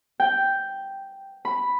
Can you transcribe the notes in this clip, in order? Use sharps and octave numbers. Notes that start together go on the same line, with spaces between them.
G5
B5